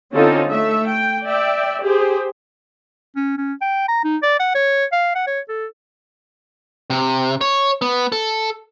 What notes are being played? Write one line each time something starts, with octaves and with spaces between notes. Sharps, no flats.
D3 C4 C#4 D#4 F4 A4
A3 E5
G5
D5 E5 G5
G4 G#4 C5
C#4
C#4
G5
A#5
D#4
D5
F#5
C#5
F5
F#5
C#5
A4
C3
C#5
B3
A4